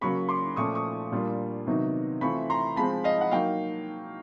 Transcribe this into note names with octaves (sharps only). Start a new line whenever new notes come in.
C#3 F#3 A#3 B5 C#6
C6 D6
A#2 F3 A3 C#4 C#6 D#6
C#6 D#6
A#2 G3 A#3 D4 F4
C3 D#3 F#3 B3 D#4
E3 A3 C4 F4 B5 C#6
A#5 C6
F3 G#3 C4 A5 B5
D#5 F5
F#5
F#3 A#3 D#4 F5 G5